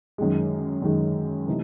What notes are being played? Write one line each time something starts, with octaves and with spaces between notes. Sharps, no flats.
F#2 D#3 G#3
F#2 D#3 G#3
C3 E3 A3 D#4